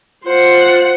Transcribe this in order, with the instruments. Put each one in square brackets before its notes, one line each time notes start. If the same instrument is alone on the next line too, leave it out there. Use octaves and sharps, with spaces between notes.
[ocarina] F4 [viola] C5 F#5